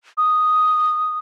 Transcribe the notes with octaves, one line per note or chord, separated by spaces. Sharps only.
D#6